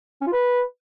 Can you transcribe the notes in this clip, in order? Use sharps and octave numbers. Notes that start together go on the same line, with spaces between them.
C#4
F4
B4